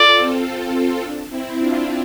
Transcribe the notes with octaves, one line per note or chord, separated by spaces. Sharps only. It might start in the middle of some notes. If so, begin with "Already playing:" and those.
Already playing: F4 A4 D5
C4
C4
D4
C4 E4
D4 F4